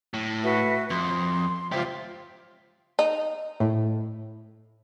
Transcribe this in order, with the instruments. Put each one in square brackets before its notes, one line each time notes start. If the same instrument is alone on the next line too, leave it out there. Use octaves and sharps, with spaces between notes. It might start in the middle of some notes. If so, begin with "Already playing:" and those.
[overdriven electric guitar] A2
[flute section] F#4 B4 E5
[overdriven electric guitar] F2 [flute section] C6
[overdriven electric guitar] C#2 G4 [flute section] F4 C5 E5
[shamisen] D#4
[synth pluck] A2